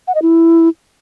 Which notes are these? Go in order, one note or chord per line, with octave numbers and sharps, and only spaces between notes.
F#5
D#5
E4